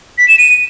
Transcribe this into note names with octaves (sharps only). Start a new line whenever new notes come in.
B6
E7
D#7